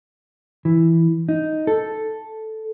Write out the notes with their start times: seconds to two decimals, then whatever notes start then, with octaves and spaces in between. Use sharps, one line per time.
0.65 E3
1.29 D#4
1.67 A4